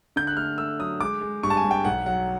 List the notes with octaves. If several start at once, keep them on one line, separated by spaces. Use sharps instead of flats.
D3 G6
F#6
A3 F6
A3 E6
F#3 D#6
G#3 D6
G#3
G2 C#6
A5
G#5
G2
G5
B1 F#5
F#3 F#5